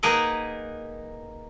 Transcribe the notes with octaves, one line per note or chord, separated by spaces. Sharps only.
A#3 D#4 G#4 A#4 B4 F#5